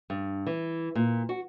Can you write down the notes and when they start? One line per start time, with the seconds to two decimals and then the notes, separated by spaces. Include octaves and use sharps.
0.10 G2
0.46 E3
0.95 A#2
1.29 F#4